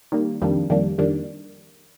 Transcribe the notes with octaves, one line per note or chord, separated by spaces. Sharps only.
D#3 G3 A#3
F2 D#3 G3 A#3 D4
F2 D#3 G3 A#3 D4
F2 D#3 G3 A#3 D4